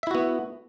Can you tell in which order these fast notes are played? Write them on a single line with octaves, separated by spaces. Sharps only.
E5 E4 F#4 B3